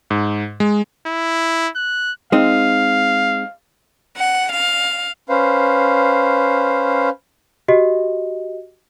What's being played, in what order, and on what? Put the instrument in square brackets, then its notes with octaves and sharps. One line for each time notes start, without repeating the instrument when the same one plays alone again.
[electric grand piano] G#2
G#3
[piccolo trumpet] E4
F#6
[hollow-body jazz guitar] G#3 C4 D#4 [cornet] F5
[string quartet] F#5
F5
[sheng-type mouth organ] C#4 B4 C5 F5
[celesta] F#4 G4 D#5